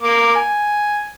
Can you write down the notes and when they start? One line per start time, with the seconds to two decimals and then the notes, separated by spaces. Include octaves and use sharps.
0.02 A#3 D6
0.35 G#5